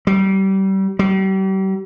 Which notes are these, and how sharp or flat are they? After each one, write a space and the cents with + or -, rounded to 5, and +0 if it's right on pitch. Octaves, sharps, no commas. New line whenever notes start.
G3 -30
G3 -40